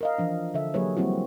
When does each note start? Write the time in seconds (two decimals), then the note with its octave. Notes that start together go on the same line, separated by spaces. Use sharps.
0.01 A#4 D#5 F5
0.18 E3 F3 D4
0.54 D3 A4 E5
0.74 F#3 A#3 G4 G#4 B4 C#5
0.97 F3 G3 A#3 C4 E4 F#4